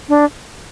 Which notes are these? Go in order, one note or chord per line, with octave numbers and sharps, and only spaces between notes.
D4